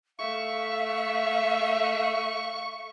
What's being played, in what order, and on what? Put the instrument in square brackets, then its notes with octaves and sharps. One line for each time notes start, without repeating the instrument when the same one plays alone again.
[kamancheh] A3 E5 [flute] F5 [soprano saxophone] C#6